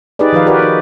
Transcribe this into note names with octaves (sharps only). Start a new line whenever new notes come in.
D#4 G4 G#4 B4 D5
D#3 F3 B4 F5
F#4 G4 A#4 B4 D5
D#4